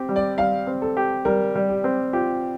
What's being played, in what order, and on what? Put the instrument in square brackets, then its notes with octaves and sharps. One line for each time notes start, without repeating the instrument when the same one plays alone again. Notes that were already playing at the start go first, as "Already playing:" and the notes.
Already playing: [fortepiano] C4 G4
G3
[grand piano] D5
[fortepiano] G3 [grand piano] F5
[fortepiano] C4
[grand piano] A4
[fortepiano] G4
[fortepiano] G3 [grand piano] A#4
[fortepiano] G3
[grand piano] G4
[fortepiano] C4
[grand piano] F4 [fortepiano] G4